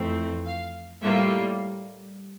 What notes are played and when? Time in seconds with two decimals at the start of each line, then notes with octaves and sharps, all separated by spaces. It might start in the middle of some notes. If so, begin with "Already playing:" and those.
Already playing: F2 E3 A3 C4
0.46 F5
1.01 A2 G3 A#3 F4 E5